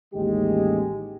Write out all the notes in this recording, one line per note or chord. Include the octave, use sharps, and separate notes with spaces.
A1 D#2 G#3 G4